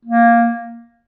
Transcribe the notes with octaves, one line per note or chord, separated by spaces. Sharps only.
A#3